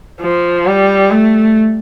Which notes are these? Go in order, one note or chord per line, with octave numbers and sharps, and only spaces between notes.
F3
G3
A3